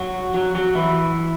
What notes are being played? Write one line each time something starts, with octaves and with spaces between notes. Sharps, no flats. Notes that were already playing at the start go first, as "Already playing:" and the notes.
Already playing: F#3 F#4
F#3 F#4
F#3 F#4
E3 E4